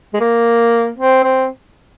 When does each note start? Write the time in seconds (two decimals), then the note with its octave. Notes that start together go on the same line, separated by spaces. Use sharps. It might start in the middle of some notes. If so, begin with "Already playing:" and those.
0.13 G#3
0.20 A#3
0.97 C4
1.23 C4